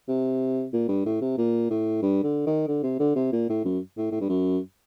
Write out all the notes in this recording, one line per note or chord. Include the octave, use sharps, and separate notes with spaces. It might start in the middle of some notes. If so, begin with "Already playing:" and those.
C3
A#2
G2
A2
C3
A#2
A2
G2
D3
D#3
D3
C3
D3
C3
A#2
A2
F#2
A2
A2
G2
F#2